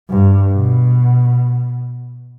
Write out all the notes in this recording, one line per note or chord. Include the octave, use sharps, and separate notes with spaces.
G2
B2